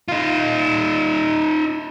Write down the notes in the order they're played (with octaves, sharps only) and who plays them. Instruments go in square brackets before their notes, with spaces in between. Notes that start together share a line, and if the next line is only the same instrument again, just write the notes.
[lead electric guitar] D#4 F4